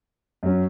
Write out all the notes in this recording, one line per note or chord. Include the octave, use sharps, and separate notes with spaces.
F#2 F#3 C#4